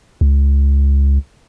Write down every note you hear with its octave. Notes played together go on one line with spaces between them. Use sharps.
C#2